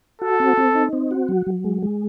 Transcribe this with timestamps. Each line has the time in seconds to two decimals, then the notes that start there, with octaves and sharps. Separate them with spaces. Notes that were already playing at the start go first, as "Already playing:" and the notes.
0.22 F#4 A4
0.40 C4
0.57 C4
0.75 D#4
0.93 C4
1.11 F#4
1.28 F#3
1.46 F#3
1.64 G#3
1.82 G#3